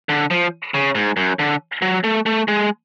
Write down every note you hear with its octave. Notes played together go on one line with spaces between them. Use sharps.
D3
F3
C#3
G#2
F#2
D3
F#3
A3
A3
G#3